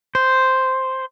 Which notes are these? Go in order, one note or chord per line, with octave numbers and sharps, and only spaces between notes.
C5